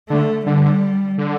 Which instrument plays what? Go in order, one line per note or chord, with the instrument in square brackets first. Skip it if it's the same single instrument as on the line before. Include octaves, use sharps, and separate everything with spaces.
[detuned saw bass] D3 [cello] A3
[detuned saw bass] D3 [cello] G3
[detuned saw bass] D3